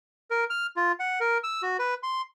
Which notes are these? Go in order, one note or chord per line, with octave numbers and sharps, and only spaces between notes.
A#4
F6
F4
F#5
A#4
E6
F#4
B4
C6